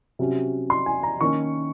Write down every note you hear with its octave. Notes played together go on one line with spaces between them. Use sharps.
C3 F#3 C#4
C6
G#5
A#5
D#3 A#3 C#4 C#6